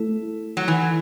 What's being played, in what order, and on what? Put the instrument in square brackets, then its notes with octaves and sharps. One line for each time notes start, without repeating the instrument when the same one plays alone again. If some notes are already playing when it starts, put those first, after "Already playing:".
Already playing: [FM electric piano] A3 E4 A4
[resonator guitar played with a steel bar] F#3
E3